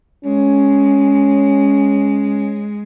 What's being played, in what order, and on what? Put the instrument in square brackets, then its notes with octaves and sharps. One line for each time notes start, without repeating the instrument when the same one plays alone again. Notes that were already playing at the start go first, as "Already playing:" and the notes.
[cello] G#3 [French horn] C#4